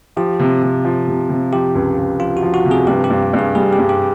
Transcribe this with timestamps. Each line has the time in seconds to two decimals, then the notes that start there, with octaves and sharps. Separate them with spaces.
0.17 F3 G4
0.39 C3
0.62 C3
0.85 F3
1.07 C3
1.29 C3
1.53 F3 G4
1.75 C#2
1.97 C#2
2.20 F3 F4
2.37 F#4
2.42 F3
2.54 F#4
2.65 C3
2.71 G#4
2.87 G2 G4
3.04 G4
3.10 G2
3.33 G2
3.39 G#4
3.55 G3 G#4
3.73 G4
3.78 G2
3.89 G4